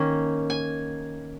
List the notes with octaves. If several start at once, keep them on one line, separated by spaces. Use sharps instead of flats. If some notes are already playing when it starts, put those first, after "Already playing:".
Already playing: D#3 A#3 C#4
G#5